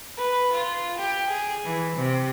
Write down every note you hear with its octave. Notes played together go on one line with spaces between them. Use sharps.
B4
F4
G4
G#4
E3
C3